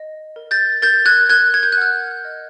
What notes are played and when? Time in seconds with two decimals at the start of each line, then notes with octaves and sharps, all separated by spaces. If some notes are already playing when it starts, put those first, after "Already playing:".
Already playing: D#5
0.36 A#4
0.51 G6 A6
0.82 A#4 G6 A6
1.06 F#6 G#6
1.29 A#4 F#6 G#6
1.54 G#6
1.63 G6
1.72 F#6
1.77 F#5 F6 G6
2.25 D#5